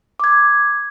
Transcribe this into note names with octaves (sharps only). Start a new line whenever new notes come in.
D6 G#6